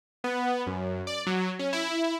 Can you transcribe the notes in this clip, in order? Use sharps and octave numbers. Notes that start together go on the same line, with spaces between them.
B3
F#2
D5
F#3
C#4
E4